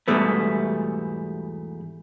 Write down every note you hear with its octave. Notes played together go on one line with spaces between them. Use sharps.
E2 G#2 B2 G3 A3 B3